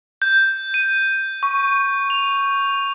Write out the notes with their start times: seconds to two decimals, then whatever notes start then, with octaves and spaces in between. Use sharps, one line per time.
0.22 G6
0.74 D#7
1.43 C#6
2.10 F7